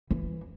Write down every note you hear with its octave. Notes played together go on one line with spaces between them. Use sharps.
E3